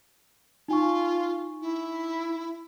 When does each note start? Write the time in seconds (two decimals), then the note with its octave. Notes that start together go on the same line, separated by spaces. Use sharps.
0.68 D#4 F4 G#5 C#6
1.61 E4